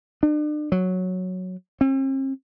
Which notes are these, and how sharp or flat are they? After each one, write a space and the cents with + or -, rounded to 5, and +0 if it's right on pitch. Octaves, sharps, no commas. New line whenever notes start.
D4 +40
F#3 -5
C4 +45